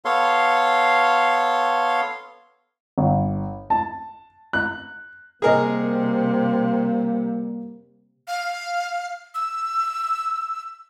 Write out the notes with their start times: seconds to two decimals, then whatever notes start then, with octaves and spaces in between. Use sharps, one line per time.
0.05 B3 A4 C#5 F5 C6
2.98 G1
3.70 A5
4.53 F#6
5.42 C3 G3 A#3 G#4 A#4 D#5
8.28 F5
9.35 E6